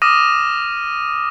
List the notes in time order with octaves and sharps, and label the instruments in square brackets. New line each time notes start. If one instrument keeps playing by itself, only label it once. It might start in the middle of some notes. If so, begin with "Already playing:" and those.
[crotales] D6 D#6 F6 A#6 D#7 E7